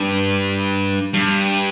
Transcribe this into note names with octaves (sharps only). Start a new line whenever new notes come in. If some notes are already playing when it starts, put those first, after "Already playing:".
Already playing: G2
G2